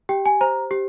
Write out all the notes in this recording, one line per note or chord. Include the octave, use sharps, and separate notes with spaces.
G4 G5
G#5
C5 A#5
G4